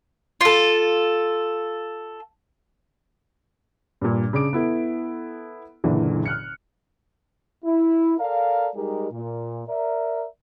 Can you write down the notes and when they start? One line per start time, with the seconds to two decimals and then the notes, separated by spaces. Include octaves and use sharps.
0.41 F4 A4
4.01 G2 A#2
4.33 C#3 D4 D6 D7
4.53 B3 E4 A4
5.84 F#1 A#2 D3 E3
6.26 F6 F#6 C#7
7.64 E4
8.18 A4 A#4 D5 F5
8.73 G3 G#3 D#4 G4 G#4 A#4
9.10 A#2
9.67 A#4 D5 E5